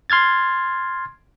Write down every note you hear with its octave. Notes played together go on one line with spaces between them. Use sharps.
C6 F6 G#6 A6